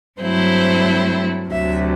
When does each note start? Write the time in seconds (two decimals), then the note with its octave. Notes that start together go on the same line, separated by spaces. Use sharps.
0.19 G2 F#3 A3 C4 E4 C5
1.49 D2 C3 F#3 E5